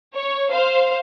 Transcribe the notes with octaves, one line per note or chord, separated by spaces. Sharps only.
C#5
C5 F5